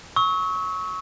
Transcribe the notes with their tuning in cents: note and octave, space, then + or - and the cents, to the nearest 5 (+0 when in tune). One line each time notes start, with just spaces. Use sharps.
C#6 +0 E6 -40